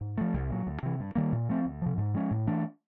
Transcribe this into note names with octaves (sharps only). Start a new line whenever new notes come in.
G#2
F3 A3
C2
A#2 F#3
D2
C3 E3
G2
D#3 G3 A#3
A#2
F3 A3 C4
D2
C3 F3
G#2
F3 G#3 C#4
A2
E3 A3 D4